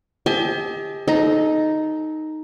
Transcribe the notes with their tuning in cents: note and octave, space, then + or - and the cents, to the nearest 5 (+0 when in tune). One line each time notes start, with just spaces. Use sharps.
G4 +30 D#5 +35 A5 -45
D#4 +0 A4 -25 D#5 +0